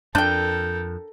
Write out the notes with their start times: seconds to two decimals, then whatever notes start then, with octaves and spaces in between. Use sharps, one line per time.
0.15 F2 D4 A4 A#4 G5 G6